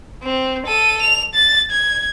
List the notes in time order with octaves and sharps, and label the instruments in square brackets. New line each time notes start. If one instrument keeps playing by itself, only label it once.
[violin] C4
A4 D#7
F7
A6
G#6